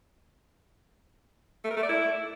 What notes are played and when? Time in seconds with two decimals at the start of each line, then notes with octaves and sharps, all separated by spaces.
1.65 A3
1.71 A#4
1.77 A3
1.83 D5
1.89 E4